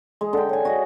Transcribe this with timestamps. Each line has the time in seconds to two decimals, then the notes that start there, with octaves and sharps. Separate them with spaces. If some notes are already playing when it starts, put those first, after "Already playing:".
0.21 G#3
0.33 D3 G5
0.49 C#5 G#5
0.65 F#4 D#5